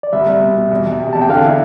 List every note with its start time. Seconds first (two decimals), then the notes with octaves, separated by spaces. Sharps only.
0.03 D5
0.13 C2 E5
0.27 C2
0.42 B2
0.57 B2
0.71 E2
0.86 E2
1.00 C3
1.13 E2 A5
1.22 G5
1.29 D3 F5
1.44 E4